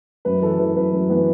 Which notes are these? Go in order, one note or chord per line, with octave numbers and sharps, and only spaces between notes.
F#2 B4
E3 A4
E3 B4
F#2 B4
F#2
E3 B3